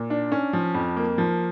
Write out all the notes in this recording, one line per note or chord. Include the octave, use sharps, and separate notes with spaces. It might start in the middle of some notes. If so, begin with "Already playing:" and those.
Already playing: A#2
D4
C#4
F3
F2
A#3
F3